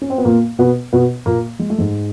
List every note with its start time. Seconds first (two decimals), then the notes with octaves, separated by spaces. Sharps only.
0.02 C#4
0.10 C4
0.18 B3
0.25 A#2 A#3
0.59 B2 B3
0.93 B2 B3
1.26 A#2 A#3
1.59 G#3
1.70 A3
1.78 G#2 G#3